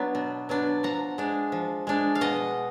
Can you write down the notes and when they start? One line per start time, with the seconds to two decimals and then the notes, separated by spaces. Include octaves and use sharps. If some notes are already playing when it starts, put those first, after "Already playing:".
Already playing: F#3 B3 D4 F#5
0.15 B2
0.49 F#3 B3 D4
0.83 F3 F#5 A#5
1.18 G#3 D4
1.52 F3
1.87 G#3 D4
2.15 F5
2.21 B2 D#5 F#5